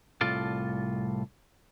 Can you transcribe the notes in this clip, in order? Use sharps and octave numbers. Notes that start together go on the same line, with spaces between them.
C2 A2 F4 A4 D5